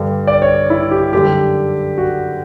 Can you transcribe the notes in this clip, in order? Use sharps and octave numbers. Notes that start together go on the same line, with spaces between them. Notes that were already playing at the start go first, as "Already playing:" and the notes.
Already playing: G2 D3 G3
D5
C#5
E4
G4
F#2 D3 G3 G4
F#4